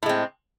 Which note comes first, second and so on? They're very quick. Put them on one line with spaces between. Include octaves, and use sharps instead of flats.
A2 G#3 C4